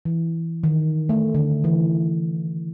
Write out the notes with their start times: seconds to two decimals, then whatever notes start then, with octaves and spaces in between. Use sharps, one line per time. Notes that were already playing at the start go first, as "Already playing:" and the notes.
0.05 E3
0.63 D#3
1.09 A3
1.35 D3
1.64 E3